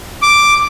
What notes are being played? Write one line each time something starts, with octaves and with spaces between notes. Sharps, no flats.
D6